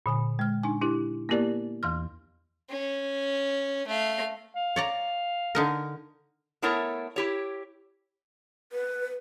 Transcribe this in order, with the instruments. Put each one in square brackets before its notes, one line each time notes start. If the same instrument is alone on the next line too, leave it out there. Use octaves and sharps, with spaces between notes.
[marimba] A#2 D3 G#5
G#3 F6
D4 D#4 G#5
D4 E4 G4
A#3 B3 E4 G4 A#4 D5
E2 E3 C6 F6
[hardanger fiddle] C#4
A3 F5
[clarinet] F5
[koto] C#5 D5 A#5
D3 D#4 A#4
[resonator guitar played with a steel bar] A3 B3 E4 A#4 C#5
E4 G4 C#5
[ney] B4